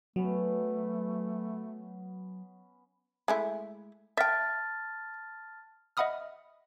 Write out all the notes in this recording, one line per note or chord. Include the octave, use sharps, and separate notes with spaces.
F#3 A3 B3 C#4 B4
G#3 A3 E4
E5 G5 A5 F6 A6
D#5 E5 F#5 B5 D#6 F6